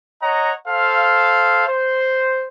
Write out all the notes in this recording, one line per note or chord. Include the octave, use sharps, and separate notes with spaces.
C#5 D#5 F#5 A#5
A4 C5 F5
C5